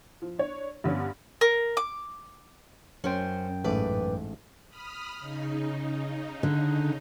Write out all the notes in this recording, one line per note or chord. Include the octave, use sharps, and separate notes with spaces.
F3
D4 C#5
G2 D3 B3 C#4
A#4
D6
F#2 C#4 C5 G5
A1 G#2 A3 B4 D5
B5 D#6 F6
C#3 D#4
D3